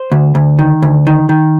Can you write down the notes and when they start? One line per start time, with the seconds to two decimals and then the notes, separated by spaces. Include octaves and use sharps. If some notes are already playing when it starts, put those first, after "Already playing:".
Already playing: C5
0.12 D2
0.35 D2
0.59 D#3
0.82 D2
1.07 D#3
1.29 D#3